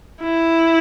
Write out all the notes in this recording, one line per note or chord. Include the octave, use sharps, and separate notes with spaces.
E4